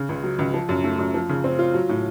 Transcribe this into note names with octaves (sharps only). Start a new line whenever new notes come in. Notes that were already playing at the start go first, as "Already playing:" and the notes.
Already playing: C#3
C#2
F#3
C#2
F3
F#2
A3
F#2
F3
C#3
C4
F4
F#3
A2